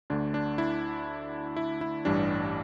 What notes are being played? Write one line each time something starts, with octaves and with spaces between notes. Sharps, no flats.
D2 D3 A3 D4
D4
E4
E4
E4
A1 G2 E3 G3 D4